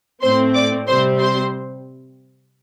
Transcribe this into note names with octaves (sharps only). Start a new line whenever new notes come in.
A2 A3 C4 C5 C6
D5 D6
C3 G3 C4 C5 C6
C5 C6